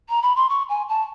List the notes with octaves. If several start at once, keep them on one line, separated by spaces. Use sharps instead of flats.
A#5
B5
C6
C#6
G#5
A5